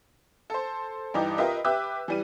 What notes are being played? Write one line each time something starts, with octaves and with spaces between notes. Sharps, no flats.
A4 C5
G2 E3 D#4 G4 D6
F4 G4 A#4 B4 D#5 E5
G4 B4 E5 D6 E6 F#6
E3 G3 D#7